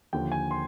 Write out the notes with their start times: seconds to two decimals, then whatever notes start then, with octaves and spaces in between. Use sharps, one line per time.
0.13 D#2 D3 F3 G5
0.32 G#5
0.51 C6